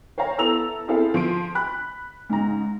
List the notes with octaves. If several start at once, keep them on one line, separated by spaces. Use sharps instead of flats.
C5 C#5 F5 A#5
B3 E4 A4 A#5 E6 F7
C4 E4 G#4 A4 C5 F5
F3 C6 D7
B5 F#6
G#2 C#3 A#5